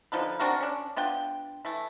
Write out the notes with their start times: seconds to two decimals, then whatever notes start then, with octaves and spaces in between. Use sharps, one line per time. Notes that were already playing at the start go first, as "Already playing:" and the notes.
0.12 D3 F3 D#4 B4
0.40 C4 D4 F#4 A#4
0.61 C#4 D4
0.96 B3 D4 F4 G5
1.65 E3 A3